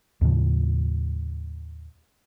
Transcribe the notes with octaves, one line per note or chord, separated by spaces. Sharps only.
D#2 A2 C#3 F3